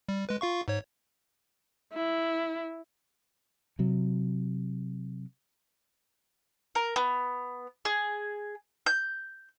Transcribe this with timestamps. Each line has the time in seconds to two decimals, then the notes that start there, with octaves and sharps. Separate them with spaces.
0.09 G3
0.29 G#3 B4
0.41 F4 F5 C#6
0.68 G#2 C#5
1.93 E4
3.79 C3 F#3
6.75 A#4
6.96 B3
7.85 G#4
8.86 G6